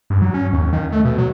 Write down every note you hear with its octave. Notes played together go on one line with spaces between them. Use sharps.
G2
F#3
C#4
D#2
D#3
A3
B2
F#3